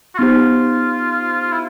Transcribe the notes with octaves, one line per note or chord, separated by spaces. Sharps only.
F#4
B3 D#4 F4 G4 C5
E4